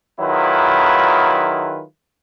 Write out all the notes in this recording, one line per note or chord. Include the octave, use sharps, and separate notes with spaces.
D#3 F#3 E4 F4 G#4 B4